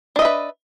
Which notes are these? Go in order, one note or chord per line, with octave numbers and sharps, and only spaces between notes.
D4 B4 D#5 E5